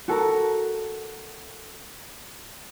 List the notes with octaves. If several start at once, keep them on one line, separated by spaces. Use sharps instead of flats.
F#4 A4 A#4 A#5